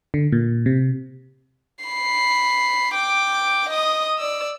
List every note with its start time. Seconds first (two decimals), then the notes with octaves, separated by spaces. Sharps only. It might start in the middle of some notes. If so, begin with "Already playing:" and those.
0.14 D3
0.32 A#2
0.66 C3
1.85 B5 C7
2.94 G5 D6
3.69 D#5 D#6
4.18 D5 E6